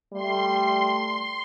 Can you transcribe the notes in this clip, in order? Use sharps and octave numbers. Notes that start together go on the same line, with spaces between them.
G3 A3 C6